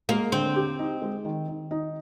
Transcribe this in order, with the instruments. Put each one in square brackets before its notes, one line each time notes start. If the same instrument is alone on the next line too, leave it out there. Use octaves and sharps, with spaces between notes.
[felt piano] G#3 [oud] A#3
[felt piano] D3 [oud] C4
[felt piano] G4
D#4
G#3
D#3
D#3
D#4